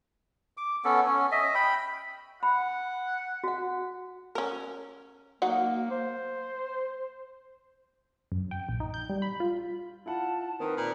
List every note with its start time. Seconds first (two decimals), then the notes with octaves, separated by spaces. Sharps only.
0.57 D6
0.84 B3 C#4 A4
1.06 C#4
1.32 D#5 E5
1.55 G5 B5
2.43 F#5 B5
3.44 F#4 F#5
4.35 C#4 A#4
5.42 F#3 A#3 D#4 F#5
5.91 C5
8.32 F#2
8.51 G5
8.69 A#1
8.80 D#4
8.94 G6
9.09 G3
9.22 B5
9.40 F4
10.06 E4 F4 F#5 A5
10.60 D#3 C4 A#4 B4 D#6
10.77 A#2